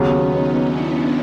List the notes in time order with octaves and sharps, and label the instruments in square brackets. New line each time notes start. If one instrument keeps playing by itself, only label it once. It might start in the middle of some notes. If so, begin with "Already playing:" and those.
Already playing: [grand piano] D#2 C#3 F#3 [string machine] B3 C#4
[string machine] C#4 D#4
D4 E4